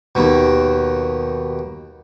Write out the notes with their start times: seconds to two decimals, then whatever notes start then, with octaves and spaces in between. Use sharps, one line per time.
0.15 D#2 B2